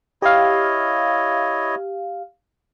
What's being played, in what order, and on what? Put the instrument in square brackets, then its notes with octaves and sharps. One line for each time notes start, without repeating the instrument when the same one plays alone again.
[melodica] E4 C#5 D#5 [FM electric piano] G4 F5